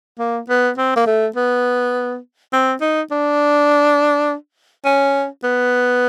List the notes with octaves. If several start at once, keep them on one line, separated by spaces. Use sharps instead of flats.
A#3
B3
C4
A#3
A3
B3
C4
D#4
D4
C#4
B3